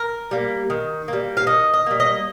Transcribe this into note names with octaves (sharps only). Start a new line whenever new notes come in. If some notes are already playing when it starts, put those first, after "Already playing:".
Already playing: A#4
G3 A#3
D#3
G3 A#3
F5
D#3 D#5
D#5
G3 A#3
D#5